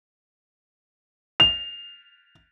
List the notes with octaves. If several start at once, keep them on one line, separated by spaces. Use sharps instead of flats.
F7